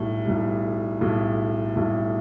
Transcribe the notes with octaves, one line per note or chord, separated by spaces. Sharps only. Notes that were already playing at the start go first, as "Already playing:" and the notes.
Already playing: B1 A2 G3
B1 A2 G3
B1 A2 G3
B1 A2 G3